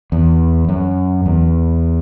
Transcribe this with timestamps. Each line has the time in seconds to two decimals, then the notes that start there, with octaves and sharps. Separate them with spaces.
0.12 E2
0.69 F#2
1.26 E2